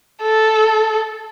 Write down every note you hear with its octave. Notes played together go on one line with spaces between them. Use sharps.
A4